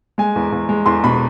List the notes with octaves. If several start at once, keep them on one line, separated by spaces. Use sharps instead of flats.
G#3 G#5
E2
E2
G#3
E2 C6
B2 B5